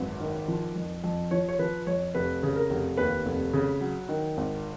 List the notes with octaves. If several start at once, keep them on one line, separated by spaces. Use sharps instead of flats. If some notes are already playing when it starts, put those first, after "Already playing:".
Already playing: G#1 F#2 B4
D#3
F3
F2
F2
F3 C#5
C#5
F3 B4
F2 C#5
F1 B4
C#3
A#4
F1
D#2 B4
F1
C#3
F#3
D#3
G#1